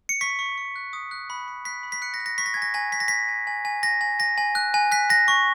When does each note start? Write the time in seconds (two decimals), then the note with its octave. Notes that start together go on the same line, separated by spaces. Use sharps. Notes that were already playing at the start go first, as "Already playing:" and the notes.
0.09 C#7
0.21 C#6 B6
0.39 C#6
0.58 C#6
0.76 F#6
0.93 D#6
1.11 F#6
1.30 B5
1.48 B5
1.65 F#6 B6
1.83 B5
1.92 B6
2.02 F#6 C#7
2.14 A#6
2.20 F#6
2.26 A#6
2.38 C#6 B6
2.46 A#6
2.54 G#5 G#6
2.62 A#6
2.74 G#5 A#6
2.92 G#5 B6
3.00 A#6
3.08 G#5 B6
3.28 G#5
3.47 G#5
3.65 G#5
3.83 G#5 A#6
4.01 G#5
4.19 G#5 A#6
4.38 G#5
4.55 F#6
4.74 G#5
4.92 F#6 B6
5.10 G#5 A#6
5.28 C#6